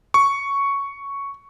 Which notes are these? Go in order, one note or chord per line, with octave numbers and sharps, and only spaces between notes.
C#6